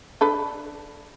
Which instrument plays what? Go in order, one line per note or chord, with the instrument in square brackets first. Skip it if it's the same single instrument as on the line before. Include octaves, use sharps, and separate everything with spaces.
[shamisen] D4 A4 B4